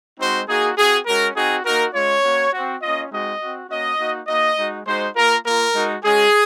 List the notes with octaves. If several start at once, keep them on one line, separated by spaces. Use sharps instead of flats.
G#3 C4 D#4 F#4 C5
A#3 D#4 F#4 G#4
C4 F#4 G#4
G#3 C#4 F#4 A#4
C4 D#4 F#4 G#4
A#3 D#4 F#4 A#4
G#3 C#4 F4 C#5
A#3 C#4 F#4
C4 F#4
A#3 C#4 F4 D#5
G#3 C4 D#4 F#4 D#5
C4 F#4
A#3 C#4 F#4 D#5
A#3 D#4 F#4
A#3 D#4 F#4 D#5
G#3 D#4 F#4
G#3 D#4 F#4 C5
A#3 F4 A#4
A#3 F4 A#4
G#3 D#4 F#4
G#3 C#4 F#4 G#4